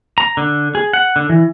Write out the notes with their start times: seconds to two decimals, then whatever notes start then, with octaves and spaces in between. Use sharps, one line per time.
0.18 A#5
0.37 D3
0.75 G#4
0.93 F#5
1.16 D3
1.29 E3